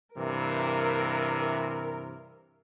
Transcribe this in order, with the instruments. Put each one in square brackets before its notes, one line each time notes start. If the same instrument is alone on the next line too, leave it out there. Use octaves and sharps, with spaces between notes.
[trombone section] G2 C3 E3 [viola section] A#4